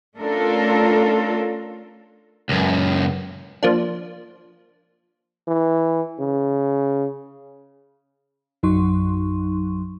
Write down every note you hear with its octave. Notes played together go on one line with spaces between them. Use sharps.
A3 C#4 D4 F4 A4 A#4
C#2 F#2
F3 A#3 D4
E3
C#3
A#1 F#2 F#3 D#4 C6 C#6